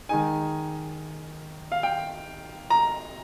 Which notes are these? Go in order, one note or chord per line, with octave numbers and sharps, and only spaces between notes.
D#3 G#3 D#4 G#5
F5
G5
A#5